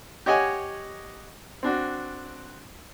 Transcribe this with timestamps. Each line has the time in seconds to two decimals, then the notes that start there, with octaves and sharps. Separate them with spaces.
0.26 G4 C#5 D#5 F#5 G#5
1.63 C4 D4 F#4